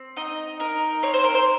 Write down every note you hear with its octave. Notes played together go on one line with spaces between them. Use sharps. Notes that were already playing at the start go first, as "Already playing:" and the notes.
Already playing: C4
D#4 D#5
D#4 A#4
C4 C#5
C5
A#4
C5